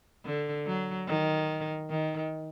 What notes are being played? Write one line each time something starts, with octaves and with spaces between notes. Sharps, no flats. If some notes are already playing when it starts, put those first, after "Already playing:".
D3
F#3
D#3
D#3